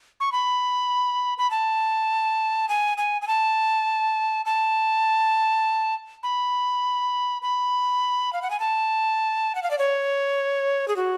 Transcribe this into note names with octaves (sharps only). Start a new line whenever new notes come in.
C#6
B5
B5
A5
G#5
G#5
G#5
A5
A5
B5
B5
F5
F#5
G#5
A5
F#5
F5
D5
C#5
G#4
F#4